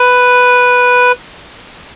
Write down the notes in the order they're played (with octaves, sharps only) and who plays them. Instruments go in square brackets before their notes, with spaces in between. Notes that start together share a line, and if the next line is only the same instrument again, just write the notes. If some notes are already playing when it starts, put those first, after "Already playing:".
Already playing: [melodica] B4